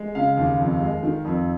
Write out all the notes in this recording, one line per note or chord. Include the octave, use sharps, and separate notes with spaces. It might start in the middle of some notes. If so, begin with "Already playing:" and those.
Already playing: G#3
C#3 F5
D#2
F2
G#3
D#3
F2